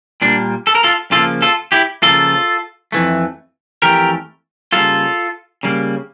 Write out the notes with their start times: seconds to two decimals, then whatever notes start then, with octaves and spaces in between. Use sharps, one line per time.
0.22 A#2 G3 A#3 D4
0.67 A4
0.75 A#4
0.83 F4 A4
1.11 C#3 F3 A#3 F4 A4
1.42 F4 A4
1.72 E4 G4
2.02 C#3 F3 A#3 F4 A4
2.92 F2 E3 A3
3.82 F2 E3 A3 G4 A#4
4.72 C#3 G3 A#3 F4 A4
5.63 C#3 G3 A#3